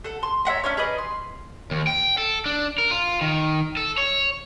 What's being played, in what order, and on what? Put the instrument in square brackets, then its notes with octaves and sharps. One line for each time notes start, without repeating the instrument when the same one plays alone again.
[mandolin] A4 F#5
C6
C#5 E5 F#5 A#5
C#4 D4 C#5
G#4 B4 D5 D#5
C6
[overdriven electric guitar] D#2
G5
A4
D4
A#4
F4
D#3
A4
C#5